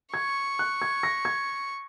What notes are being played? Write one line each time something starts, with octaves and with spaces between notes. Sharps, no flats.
C#6 G#6
F#6
G#6
A#6
G#6